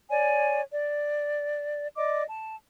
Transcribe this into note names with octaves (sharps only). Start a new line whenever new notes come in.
C#5 D5 G#5
D5
D5 D#5 D6
A5